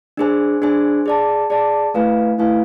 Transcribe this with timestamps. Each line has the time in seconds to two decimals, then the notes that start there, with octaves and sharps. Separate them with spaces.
0.17 D4 G#4 C5 G#5
0.62 D4 G#4 C5 G#5
1.06 G#4 D5 A5
1.50 G#4 D5 A5
1.94 A3 E4 B4 F5 G#5
2.38 A3 E4 B4 F5 G#5